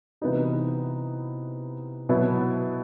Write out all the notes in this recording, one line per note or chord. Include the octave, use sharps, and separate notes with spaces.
C3 E3 B3 D#4 F#4
B2 F#3 B3 E4